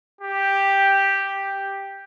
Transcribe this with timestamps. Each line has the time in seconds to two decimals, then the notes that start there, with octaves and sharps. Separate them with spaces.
0.21 G4